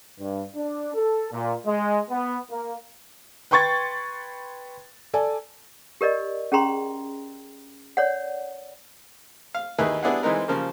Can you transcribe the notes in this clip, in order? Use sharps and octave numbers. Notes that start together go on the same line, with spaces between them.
G2
D4
A4
A#2
G#3
B3
A#3
B4 G5 C6 C#6 G#6 A6
A4 D5 G#5
G4 A#4 D5 D#5
C#4 G#4 G5 A#5 C6
C#5 D5 F#5
F5
D#2 D#4 E4 G#4 A#4 B4
G3 B3 D4 E4 G#4 F#5
E3 G#3 C4 D#4 A#4 B4
C#3 F3 G3 A#3